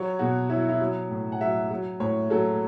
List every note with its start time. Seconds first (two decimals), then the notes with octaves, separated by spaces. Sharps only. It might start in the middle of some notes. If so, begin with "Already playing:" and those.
Already playing: F#3 C#5
0.19 B2 F#4
0.49 F#3 E4
0.69 E4
0.81 F#3
1.10 A2
1.32 F#5
1.41 F#3 E5
1.71 F#3
2.00 A2 C#5
2.30 F#3 A4